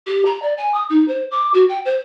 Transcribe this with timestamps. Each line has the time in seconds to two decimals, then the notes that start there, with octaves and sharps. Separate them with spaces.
0.07 G4
0.25 A#5
0.42 D5
0.57 G#5
0.74 D#6
0.90 D#4
1.08 C5
1.31 D6
1.54 F#4
1.69 G5
1.85 C5